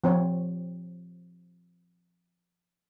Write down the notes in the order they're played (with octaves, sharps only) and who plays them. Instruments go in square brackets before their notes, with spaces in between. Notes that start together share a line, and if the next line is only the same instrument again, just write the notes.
[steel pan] F3 C4 C#5